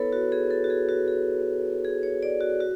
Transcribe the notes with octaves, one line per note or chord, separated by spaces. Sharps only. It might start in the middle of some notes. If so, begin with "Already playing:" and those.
Already playing: B3 E4 A4 B4 C#5
F#4
G#4
A4
F#4
G#4
F#4
G#4
G#4
C#5
D5
F#4
F#4